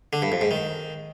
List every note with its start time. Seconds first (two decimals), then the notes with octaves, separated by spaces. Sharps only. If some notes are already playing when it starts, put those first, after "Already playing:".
0.13 D3
0.22 G2
0.32 F2
0.41 G#2
0.51 D#3